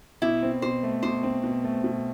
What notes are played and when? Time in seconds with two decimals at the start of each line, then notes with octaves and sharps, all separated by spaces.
0.22 B2 E4
0.42 C4
0.62 B2 C5
0.83 A3
1.03 B2 C5
1.23 C4
1.44 B2
1.64 A3
1.84 B2